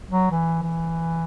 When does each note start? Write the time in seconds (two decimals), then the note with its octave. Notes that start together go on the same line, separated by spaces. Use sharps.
0.09 F#3
0.31 E3
0.62 E3